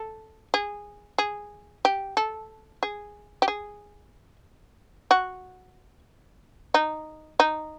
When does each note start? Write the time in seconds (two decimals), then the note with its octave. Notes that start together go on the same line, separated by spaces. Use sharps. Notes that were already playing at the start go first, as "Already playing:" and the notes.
Already playing: A4
0.54 G#4
1.18 G#4
1.85 G4
2.17 A4
2.83 G#4
3.42 G4
3.48 G#4
5.11 F#4
6.74 D#4
7.40 D#4